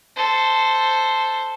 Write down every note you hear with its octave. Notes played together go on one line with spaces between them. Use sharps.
A4 C5